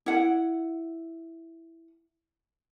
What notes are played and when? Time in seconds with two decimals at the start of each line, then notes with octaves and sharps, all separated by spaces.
0.06 E4 F#5